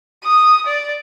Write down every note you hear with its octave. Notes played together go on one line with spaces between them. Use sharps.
D#6
D5